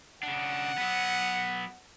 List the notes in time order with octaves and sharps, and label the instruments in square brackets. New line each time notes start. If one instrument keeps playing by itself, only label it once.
[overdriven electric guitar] C#3 D4 [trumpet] F#5
[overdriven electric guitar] F#3 B3